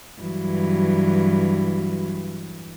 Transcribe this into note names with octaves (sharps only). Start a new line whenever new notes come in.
G2 E3 F#3